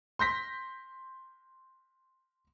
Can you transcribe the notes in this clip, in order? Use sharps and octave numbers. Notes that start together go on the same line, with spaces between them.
C6 G6 A#6 B6